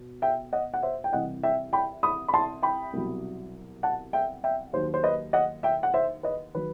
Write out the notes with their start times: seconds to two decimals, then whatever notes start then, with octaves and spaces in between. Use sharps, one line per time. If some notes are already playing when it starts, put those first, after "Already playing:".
Already playing: B2
0.22 E5 G5
0.53 D#5 F#5
0.74 F#5
0.83 C5 E5
1.04 G5
1.13 C2 C3 E3 D#5 F#5
1.43 E5 G5
1.73 G5 B5
2.03 B5 D#6
2.28 B5
2.34 A5 C6
2.63 G5 B5
2.93 C2 B2 F#3
3.83 F#5 A5
4.13 E5 G5
4.44 E5 G5
4.73 D#2 D#3 F#3 C5
4.94 C5
5.03 B4 D#5
5.33 D#5 F#5
5.63 E5 G5
5.83 F#5
5.94 C5 E5
6.23 B4 D#5
6.54 D#3 F#3 B4